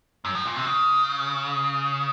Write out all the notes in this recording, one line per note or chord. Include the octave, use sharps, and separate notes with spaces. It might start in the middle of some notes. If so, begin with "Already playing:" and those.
F#2
A2
A#2
C3
C#3